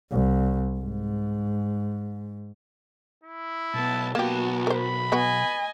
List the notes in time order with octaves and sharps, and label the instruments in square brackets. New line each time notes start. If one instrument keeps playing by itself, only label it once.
[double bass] C2
G#2
[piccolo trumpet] E4
[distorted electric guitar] B1 [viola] B3 A5
[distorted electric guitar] B1 A5 [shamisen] A#3 G4 [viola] B3 F#4
[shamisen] A#4 C5 [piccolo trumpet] B5
[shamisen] B3 F#4 B4 [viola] D#5 G#5